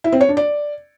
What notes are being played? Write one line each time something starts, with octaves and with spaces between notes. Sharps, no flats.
E4
C4
C#5
D4
D5